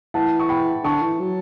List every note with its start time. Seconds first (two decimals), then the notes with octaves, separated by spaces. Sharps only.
0.14 E3 F#5 A5
0.40 C#6
0.49 G5 B5
0.84 D3 A5 C#6
1.02 E3
1.19 F#3